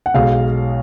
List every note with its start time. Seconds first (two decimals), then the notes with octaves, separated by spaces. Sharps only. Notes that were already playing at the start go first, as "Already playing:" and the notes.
0.06 F#5
0.14 B1 B2 G#3 F5